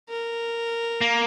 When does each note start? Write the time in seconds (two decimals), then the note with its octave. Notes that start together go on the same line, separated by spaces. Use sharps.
0.09 A#4
1.01 A#3